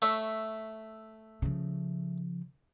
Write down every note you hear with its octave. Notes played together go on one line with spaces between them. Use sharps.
A3 C#5 E5
C#3 F3